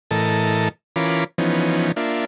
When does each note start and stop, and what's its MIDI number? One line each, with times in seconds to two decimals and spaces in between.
0.11 0.68 45
0.11 0.68 52
0.11 0.68 69
0.11 0.68 70
0.11 0.68 75
0.11 0.68 81
0.96 1.24 52
0.96 1.24 61
0.96 1.24 65
0.96 1.24 70
0.96 1.24 83
0.96 1.24 86
1.38 1.92 52
1.38 1.92 53
1.38 1.92 59
1.38 1.92 61
1.38 1.92 63
1.96 2.25 58
1.96 2.25 62
1.96 2.25 65
1.96 2.25 76